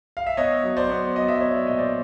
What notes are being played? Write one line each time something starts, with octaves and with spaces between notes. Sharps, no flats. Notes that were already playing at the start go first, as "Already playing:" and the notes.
F5
E5
B3 C#5 D#5
F#3
C5 D5
B3
F#3 D#5
E5
B3 C#5 D#5
D5
A#2 D#5
C5 D5